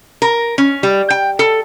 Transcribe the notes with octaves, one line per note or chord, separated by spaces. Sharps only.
A#4
C#4
G3
G5
A4